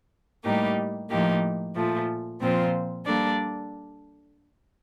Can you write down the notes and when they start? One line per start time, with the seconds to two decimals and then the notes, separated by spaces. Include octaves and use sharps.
0.44 A2 G3 A#3 D#4 G4
1.10 A2 F3 A#3 D#4 G4
1.75 A#2 F3 A3
2.40 A#2 F3 C4 F4 C5
3.05 G3 A#3 D4 A4 D5